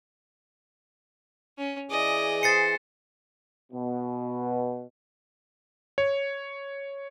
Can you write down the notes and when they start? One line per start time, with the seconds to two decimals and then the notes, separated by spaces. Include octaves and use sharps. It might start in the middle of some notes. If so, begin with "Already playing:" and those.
1.58 C#4
1.90 E3 G#4 D5 D#5
2.43 C5 A6 C7 C#7
3.73 B2
5.98 C#5